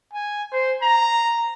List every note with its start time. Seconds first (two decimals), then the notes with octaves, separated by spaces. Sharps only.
0.13 G#5
0.52 C5
0.82 A#5